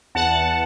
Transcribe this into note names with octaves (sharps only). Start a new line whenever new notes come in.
E2 F#5 A5